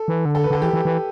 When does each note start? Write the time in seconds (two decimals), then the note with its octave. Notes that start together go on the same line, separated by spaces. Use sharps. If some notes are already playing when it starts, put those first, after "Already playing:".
Already playing: A4
0.08 E3
0.25 D3
0.35 A4
0.44 B4
0.50 D3 A4
0.62 E3 G4
0.73 E3
0.85 E3